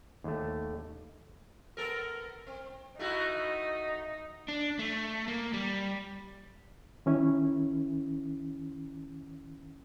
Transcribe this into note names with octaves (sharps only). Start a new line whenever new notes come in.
D#2 A3
B3 A4 A#4
C4
A3 D#4 E4 F#4
D4
A3
A#3
G3
D#3 C#4 E4